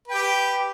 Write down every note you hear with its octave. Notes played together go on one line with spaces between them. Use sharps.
G4 B4 G5